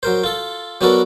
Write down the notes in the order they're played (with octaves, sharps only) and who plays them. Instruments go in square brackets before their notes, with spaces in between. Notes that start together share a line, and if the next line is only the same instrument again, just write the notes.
[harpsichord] F#3 A#4 C5
F4 A4
F#3 B3 D4 F#4 A4 A#4